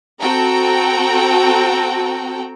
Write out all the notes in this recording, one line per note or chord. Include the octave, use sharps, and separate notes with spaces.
C4 F#4 A4 G5 A#5